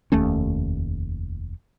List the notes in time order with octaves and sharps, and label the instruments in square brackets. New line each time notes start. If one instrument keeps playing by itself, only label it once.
[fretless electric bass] F1 D#2 A3 C#4